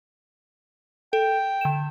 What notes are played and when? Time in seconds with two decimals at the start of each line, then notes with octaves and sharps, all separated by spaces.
1.13 A4 G5
1.61 D3 E7